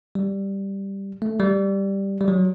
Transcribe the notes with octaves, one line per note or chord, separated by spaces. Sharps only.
G3
A3
G3
G3
F#3